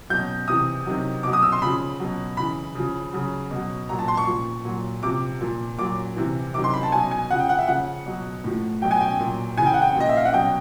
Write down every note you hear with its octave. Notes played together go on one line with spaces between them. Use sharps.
B2 F#3 G6
C3 E3 D#6
C3 D#3 F#3
B2 F#3 D6
D#6
E6
C6
C#3 F3 B5
B2 F#3
C#3 E3 B5
C#3 F3
C#3 F#3
B2 F#3
A#2 F#3 A#5
A5
C6
C#6
A#2 F3
A#2 F#3
C3 F3 D6
A#2 F3
A#2 F#3 D6
C3 E3
C3 D#3 F#3 D6
C6
B5
A5
B2 F#3 G#5
G#5
C#3 F3 F#5
G5
F#5
E5
C#3 F3 F#5
B2 F#3
A2 F3
B2 F#3 G5
G#5
G5
A#2 F#3
C#3 E3 G#5
G5
F#5
G5
A#2 F3 D#5
E5
F5
F#5
B2 F#3 G5